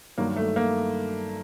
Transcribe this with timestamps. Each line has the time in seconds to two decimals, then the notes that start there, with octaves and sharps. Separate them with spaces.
0.18 G2 D#3 F#3 A#3
0.36 A3
0.56 A#3